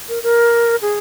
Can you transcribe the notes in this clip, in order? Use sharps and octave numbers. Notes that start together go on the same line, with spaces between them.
A#4
A#4
G#4